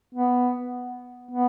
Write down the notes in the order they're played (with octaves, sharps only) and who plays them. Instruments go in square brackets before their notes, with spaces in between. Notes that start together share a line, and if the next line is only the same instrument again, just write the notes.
[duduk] B3
B3